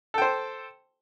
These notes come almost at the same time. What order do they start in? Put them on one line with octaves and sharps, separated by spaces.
A4 G5 C5